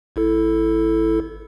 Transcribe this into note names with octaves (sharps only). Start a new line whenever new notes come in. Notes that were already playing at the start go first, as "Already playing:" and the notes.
G#1 E4 A4